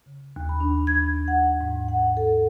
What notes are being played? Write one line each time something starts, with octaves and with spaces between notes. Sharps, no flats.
C#3
D#2
B5
D4
G#6
F#5
G#2
F#5
A4